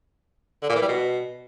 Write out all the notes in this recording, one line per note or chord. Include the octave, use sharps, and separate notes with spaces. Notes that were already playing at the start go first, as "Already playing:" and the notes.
D3
A#2
E3
G3
B2